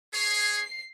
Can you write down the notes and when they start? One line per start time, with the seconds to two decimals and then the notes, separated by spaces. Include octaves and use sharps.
0.13 G#4 C#5 C7